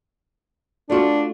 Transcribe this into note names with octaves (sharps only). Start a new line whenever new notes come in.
A3 D4 F4 F#4